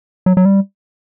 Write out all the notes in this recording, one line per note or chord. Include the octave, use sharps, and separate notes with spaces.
F#3
F#3
G3